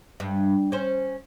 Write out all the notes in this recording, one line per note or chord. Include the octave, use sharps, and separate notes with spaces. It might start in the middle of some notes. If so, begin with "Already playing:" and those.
G2
C#4 C5